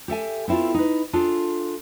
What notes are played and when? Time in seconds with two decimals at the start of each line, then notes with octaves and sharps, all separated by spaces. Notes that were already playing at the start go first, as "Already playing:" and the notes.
0.08 G4 A4 E5 G#5
0.48 B3 C4 E4 F4 A4
0.74 D#4 B4
1.13 D4 F4 G#4 A4